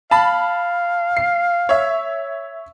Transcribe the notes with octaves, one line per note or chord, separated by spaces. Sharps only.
F5 A5 B5
C7
C#5 E5